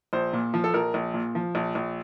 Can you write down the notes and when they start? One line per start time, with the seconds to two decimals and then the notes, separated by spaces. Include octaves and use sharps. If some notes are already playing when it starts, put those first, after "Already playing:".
0.13 A#1 C5
0.33 A#2
0.54 F3
0.64 A4
0.74 A#1 A#4
0.94 A#1
1.14 A#2
1.35 F3
1.55 A#1
1.75 A#1